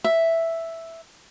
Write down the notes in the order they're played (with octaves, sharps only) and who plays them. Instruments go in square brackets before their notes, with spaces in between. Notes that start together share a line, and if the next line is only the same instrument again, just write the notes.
[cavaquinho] E5